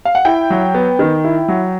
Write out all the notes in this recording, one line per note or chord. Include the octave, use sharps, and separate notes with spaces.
F5
F#5
E4 G5
F#3
B3
D#3
E4
F#3